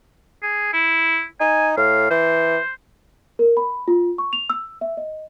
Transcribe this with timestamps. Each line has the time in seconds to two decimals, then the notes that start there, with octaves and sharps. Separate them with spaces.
0.43 G#4
0.73 E4
1.40 D#4 G#5
1.77 A2 F5
2.10 E3 C5
3.39 A#4
3.57 B5
3.88 F4
4.18 C#6
4.33 F7
4.50 E6
4.81 E5
4.97 D#5